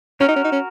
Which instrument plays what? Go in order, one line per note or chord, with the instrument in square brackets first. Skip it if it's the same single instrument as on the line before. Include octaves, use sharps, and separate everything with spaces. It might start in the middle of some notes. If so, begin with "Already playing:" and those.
[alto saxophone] C#4 [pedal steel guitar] F#4 A#4
[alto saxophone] D#4
C#4
D#4
C#4